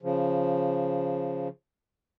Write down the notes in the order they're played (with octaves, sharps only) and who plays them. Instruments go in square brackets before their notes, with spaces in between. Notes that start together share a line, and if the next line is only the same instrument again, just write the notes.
[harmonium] C#3 F3